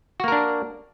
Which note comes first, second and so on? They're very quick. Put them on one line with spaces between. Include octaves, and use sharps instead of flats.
F#4 A#3 A#4 D4